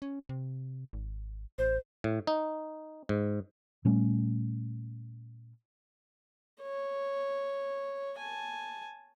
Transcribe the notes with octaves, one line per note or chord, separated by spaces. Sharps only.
C#4
C3
G#1
A1 C5
A2
D#4
G#2
A#2 G3 A3 C#4
C#5
G#5 A5